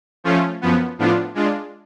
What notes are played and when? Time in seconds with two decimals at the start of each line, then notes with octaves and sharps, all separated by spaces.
0.24 F3 A3 C#4 F4
0.61 F#2 F3 B3
0.99 A2 F3 B3 D4 F4
1.35 G#3 D4 F4